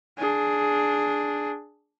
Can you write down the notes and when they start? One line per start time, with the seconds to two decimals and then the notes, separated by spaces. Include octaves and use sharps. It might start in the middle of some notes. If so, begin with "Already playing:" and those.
0.18 D4 G#4